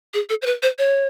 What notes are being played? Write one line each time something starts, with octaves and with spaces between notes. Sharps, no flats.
G#4
A4
C5
B4
C5
C#5